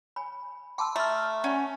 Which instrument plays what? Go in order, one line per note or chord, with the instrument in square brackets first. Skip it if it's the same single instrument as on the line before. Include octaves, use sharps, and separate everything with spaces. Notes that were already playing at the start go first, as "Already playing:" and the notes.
[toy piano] G#5 B5
[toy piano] G5 A5 E6 [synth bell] B5 C6 D6
[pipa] A3 [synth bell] A#5 F6
[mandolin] C#4 [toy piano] D5 F#5